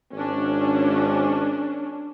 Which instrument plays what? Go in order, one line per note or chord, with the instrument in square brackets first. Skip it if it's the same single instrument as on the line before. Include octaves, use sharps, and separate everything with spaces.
[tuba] G#1 [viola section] C#4 D4